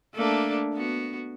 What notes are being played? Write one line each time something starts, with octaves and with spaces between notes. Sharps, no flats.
A3 A#3 D4
B3 F#4